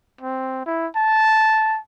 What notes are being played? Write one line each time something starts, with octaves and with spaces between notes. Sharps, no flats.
C4
E4
A5